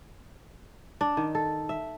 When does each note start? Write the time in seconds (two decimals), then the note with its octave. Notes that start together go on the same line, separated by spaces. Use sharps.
1.01 D4
1.17 D#3
1.35 A4
1.69 E5